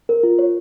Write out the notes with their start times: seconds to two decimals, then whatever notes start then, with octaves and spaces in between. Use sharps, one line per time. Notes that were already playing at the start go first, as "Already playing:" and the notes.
0.09 A#4
0.23 F4
0.39 C#5